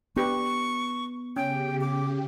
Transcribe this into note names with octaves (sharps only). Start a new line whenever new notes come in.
B3 D4 G4 B4 C#6
C#3 C#4 G4 G5
D6